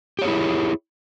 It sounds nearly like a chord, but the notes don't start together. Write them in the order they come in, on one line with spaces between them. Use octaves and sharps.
G4 C#5 G#4 E4